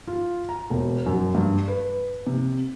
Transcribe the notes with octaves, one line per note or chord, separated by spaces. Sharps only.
F4
A#5
E1
F#2
G2
B4
C3